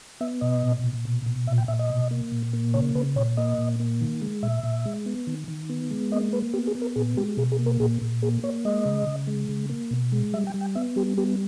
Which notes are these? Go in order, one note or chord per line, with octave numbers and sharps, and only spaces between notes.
B3 E5
B2 D#5
A#2
A#2
B2
B2
A#2 E5
G5
A#2 E5
D#5
B2
A#3
A#2
A#3
C#3 C#5
C#3 B4
A#2 C#5
A#3 D#5
A#2
A#3
D#3
G#3
A#2 E5
A#2
G#3
B3
D#3
D#3
B3
G#3
A#3 D#5
A#3 B4
B3 G4
G#4
B3
A#4
A#2 G#4
G#3 G4
B2 G#4
G#4
A#3
A#4
A#2 G#4
A#2
A#3 G#4
A#3 C#5
G#3 D#5
C#3
C#3
G#3
C#3
A#3
B2
G#3
G3 E5
G5
G3
G5
B3 E5
G3 G4
B3 G4